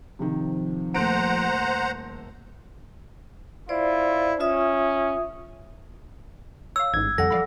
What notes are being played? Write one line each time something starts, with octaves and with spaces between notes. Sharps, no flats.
C3 D#3 F3
D#1 A3 C5 F#5 A#5 D7
E4 F4 C5 D5
C#4 F4 E5 D#6
C#5 F5 E6
A1 G#2 G#6
F2 D3 G3 A4 F#5 A#6
C#3 F3 D5 F5 B5